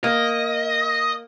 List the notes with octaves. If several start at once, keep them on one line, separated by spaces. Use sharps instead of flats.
A#3 D#5